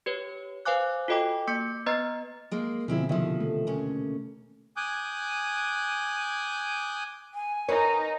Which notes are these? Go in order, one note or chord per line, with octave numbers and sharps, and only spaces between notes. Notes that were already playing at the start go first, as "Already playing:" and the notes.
G4 B4 C#5
B4 C5 F5 G#5 D6 F#6
F4 F#4 A4 D#5 G5 D6
A#3 D6 G6 C#7
B3 B4 D#5 A#5 F6 A6
G#3 A#3
B2 D3 F3 C4 E4 G#4
C3 D#3 F3 E5
A3
D#2 C#4
G#5 D6 D#6 F#6 G6
G#5
D#4 A#4 B4 C#5